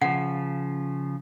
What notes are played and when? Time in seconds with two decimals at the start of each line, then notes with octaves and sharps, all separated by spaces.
0.01 C#3 F3 F#5